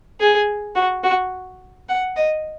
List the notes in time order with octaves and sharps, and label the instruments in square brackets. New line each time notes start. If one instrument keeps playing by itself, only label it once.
[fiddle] G#4
F#4
F#4
F#5
D#5